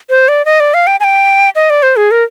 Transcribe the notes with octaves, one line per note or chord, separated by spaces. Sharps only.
C5
D5
D#5
D5
F5
G5
G#5
G5
D#5
D5
C5
G#4
A#4